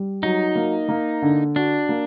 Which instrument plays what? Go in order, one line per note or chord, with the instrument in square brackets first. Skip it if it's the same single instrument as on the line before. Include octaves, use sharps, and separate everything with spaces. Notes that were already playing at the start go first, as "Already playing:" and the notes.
Already playing: [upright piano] G3
[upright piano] F#3 [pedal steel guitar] D#4
[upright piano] A#3
A#3
D3
[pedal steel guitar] D4 [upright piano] F#4
[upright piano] A#3